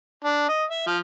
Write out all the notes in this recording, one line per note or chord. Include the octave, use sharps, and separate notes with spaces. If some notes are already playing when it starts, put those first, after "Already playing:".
D4
D#5
E5
F3